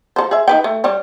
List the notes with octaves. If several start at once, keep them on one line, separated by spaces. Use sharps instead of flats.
F3 A4 C5
G#4 E5
D#4 B4 G5
A3
G3 G4 C#5